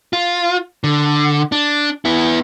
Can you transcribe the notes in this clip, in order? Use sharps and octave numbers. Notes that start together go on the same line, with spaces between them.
F4
D3
D4
B3 E4